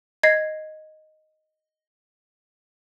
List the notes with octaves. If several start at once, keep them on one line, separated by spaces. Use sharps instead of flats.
D#5 G#6 A#6 C7